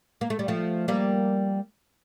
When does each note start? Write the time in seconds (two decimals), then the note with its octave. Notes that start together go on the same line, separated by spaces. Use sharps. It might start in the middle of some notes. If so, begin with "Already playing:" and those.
0.21 A#3
0.30 A3
0.39 G3
0.48 F3 A3
0.88 G3 A#3